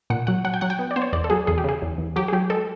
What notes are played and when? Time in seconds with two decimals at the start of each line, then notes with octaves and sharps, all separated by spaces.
0.10 A#2 F#5
0.27 F#3 F#5
0.44 F#3 F#5
0.54 G5
0.61 F#3 F#5
0.70 G5
0.79 B3
0.91 D5
0.96 B3 C5
1.02 C#5
1.13 E2 D5
1.24 A4
1.30 F#3 G#4
1.47 E2 G#4
1.58 G4
1.64 C#3 G#4
1.82 E2
1.98 E2
2.16 F#3 G4
2.28 G#4
2.33 F#3 G4
2.50 G#3 A4